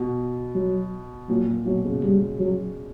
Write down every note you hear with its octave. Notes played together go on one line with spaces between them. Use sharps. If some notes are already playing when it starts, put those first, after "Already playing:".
Already playing: B2
F#3
A#2 F#3
A#2
B2 F#3
C#3
G3
F#3